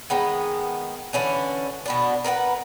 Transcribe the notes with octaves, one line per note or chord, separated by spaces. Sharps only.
D#3 G#3 B3
D3 E3 C#4 D4
B2 B3 D4
A#4 B4 D5 F#5